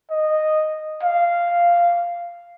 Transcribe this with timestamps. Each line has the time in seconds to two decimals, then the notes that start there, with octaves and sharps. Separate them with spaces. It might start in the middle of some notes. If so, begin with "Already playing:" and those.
0.11 D#5
1.03 F5